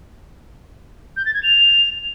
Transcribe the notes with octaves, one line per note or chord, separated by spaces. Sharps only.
G6
A6
G#6
F7